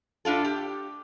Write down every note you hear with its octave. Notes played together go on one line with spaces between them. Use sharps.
A2 D4 F4 A4
G4